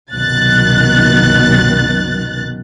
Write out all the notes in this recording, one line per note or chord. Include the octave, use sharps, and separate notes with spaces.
C2 F#2 B2 D#3 F#6 A6